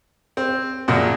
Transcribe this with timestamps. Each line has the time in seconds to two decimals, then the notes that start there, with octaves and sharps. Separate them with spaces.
0.37 C4
0.88 F#2 A#2 C#3 F3